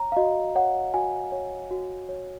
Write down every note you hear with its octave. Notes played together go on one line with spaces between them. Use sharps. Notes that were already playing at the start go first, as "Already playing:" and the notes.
Already playing: C#5 A#5
F5
F#4 D#5
C#5 F#5
F#4 G#5
C#5
F#4
C#5